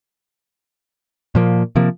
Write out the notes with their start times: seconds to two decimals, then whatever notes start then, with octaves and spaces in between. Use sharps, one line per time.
1.35 A#2 F3 A#3
1.76 C3 F3 A#3